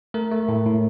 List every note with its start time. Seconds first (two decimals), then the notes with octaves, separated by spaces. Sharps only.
0.14 A3 A#4
0.31 A3
0.49 A2
0.66 A2